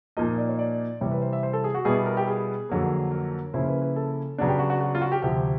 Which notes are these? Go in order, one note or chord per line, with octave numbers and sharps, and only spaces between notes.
A#2 F3 A#3 D#4 D#5
D5
C#5
D5
C3 E3 G3 C#5
B4
C5
E5
C5
A4
G#4
F#4
B2 G3 B3 E4 G#4
A#4
G4
G#4
F2 D3 F#3 A#3
A#4
C#3 F3 A#3 C#4 E4 C5
B4
B4
A4
C#3 F#3 B3 D4
G4
F#4
F#4
F#4
F4
F#4
G4
D2 C3 F3 G4